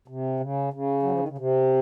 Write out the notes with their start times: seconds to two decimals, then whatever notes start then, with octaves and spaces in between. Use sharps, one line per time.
0.08 C3
0.40 C#3
0.73 C#3
1.03 F#3
1.11 F3
1.19 D#3
1.28 C#3
1.38 C3